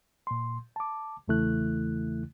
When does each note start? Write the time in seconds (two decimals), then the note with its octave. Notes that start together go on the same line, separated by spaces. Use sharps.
0.27 A#2 C6
0.76 A5 D6
1.28 E2 C#3 E3 A3 E4 F#6